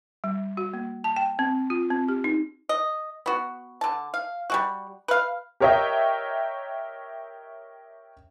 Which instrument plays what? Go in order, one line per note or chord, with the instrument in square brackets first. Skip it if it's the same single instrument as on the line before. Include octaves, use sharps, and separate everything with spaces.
[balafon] G3
F#4
A#3
A5
G5
C4
F4
C4
G4
D#4
[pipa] D#5
B3 F#4
D3 A5
F5
G3 G#3 F#4
B4 F5
[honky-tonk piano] G4 A#4 C#5 D#5 E5 G5